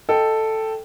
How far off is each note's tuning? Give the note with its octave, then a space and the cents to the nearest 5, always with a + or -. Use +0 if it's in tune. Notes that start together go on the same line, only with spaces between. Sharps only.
A4 +0 D#5 +0 G5 +0